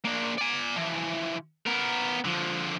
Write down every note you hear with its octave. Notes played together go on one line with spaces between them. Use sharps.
A#3 D4
D5 G#5
E3 F3
B3 A#4
D3 F3